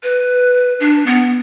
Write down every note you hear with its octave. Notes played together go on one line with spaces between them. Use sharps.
B4
D4
B3